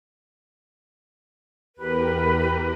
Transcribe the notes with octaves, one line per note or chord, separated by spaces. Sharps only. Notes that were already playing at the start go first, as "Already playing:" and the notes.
E2 G4 A#4 B4